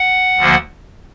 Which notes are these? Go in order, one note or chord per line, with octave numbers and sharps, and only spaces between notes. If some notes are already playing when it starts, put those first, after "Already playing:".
Already playing: F#5
D2 D3 F3 A#3